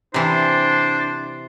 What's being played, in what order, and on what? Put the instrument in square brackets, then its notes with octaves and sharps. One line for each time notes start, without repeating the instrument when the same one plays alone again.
[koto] C3 E3 [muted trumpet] D4 [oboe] C5